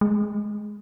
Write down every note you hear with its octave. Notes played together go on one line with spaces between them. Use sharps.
G#3